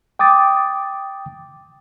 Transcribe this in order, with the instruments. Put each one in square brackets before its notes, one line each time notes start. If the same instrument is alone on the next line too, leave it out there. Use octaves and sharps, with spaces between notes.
[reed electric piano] G5 D6 D#6 A6